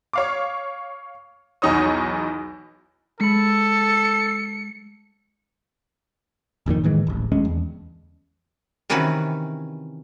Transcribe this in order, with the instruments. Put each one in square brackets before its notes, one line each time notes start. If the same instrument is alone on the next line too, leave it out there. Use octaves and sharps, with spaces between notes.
[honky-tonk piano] C#5 F5 D6
B1 E2 D#4 C#5 D#6
[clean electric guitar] G#3 B5 [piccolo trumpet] A4 [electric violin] C#7
[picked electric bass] G1 F2 A#2 D#3
A2 D#3 E3 G#3
D1 A1
D#1 D2 G#3 C#4
E2
[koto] C3 D#3 E3 C#4 F#4 B4